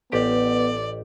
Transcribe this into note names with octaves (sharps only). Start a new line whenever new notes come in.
A1 B3 G4 D5